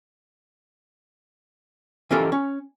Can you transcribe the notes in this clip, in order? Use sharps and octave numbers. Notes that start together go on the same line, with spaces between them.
E3 C#4 F4 G4 A4 A#4
C#4